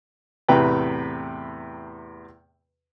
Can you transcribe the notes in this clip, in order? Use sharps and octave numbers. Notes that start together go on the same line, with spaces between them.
E2 A2 C3 B4 G5 A#5